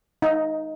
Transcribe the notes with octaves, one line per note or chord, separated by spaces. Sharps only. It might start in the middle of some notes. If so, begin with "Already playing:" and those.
D#4